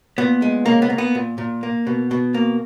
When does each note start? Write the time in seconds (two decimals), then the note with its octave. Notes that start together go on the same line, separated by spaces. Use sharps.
0.18 A#2 B3
0.42 G#3
0.66 C#3 A#3
0.82 B3
0.90 A#3
0.98 B3
1.15 A#2
1.38 A#2
1.63 A#3
1.87 B2
2.11 B2
2.34 A#3